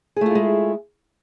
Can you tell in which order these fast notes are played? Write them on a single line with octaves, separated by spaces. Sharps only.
G#4 A3 F4 E4 G#3